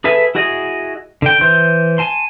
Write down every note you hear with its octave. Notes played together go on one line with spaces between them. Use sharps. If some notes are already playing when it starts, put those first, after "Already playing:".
G#4 A4 B4 E5 G#5
E4 F#4 G#4 D#5
D3 G5
E3 C5 C6 G6
G#5 A5 C6